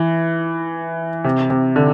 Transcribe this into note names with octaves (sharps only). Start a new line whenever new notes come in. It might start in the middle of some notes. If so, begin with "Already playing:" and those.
Already playing: E3
C3
C3
D3